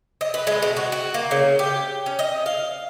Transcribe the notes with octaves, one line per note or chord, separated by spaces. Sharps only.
D#5
B4
G#3
B2
F#4
F#4
A#3
C#3
G4
C#4
D#5
F5